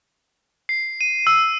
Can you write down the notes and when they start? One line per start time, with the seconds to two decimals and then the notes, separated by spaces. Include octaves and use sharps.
0.69 C7
1.01 D#7
1.27 E6